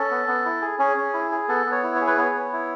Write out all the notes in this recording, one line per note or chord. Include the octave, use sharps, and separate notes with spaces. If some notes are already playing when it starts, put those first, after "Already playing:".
Already playing: C#4 A4
B3
B3
E4
G#4
C#4 G#4
C#4
E4
G#4
B3 A4
B3
C#5
E4
C#5
G#4
B4
B3 C#5
B3
E4